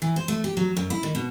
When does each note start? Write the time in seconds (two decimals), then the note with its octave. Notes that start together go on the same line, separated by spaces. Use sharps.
0.02 E3
0.16 C5
0.28 A3
0.44 G4
0.57 F#3
0.76 F#2
0.90 E4
1.03 D#3
1.15 B2